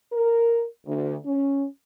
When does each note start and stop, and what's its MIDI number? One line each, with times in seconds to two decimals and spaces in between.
0.13 0.65 70
0.86 1.16 38
1.25 1.65 61